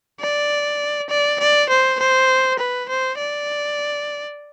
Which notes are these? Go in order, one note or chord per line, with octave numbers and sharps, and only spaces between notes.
D5
D5
D5
C5
C5
B4
C5
D5